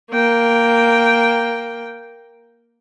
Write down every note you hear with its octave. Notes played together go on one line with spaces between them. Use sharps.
A#3 G5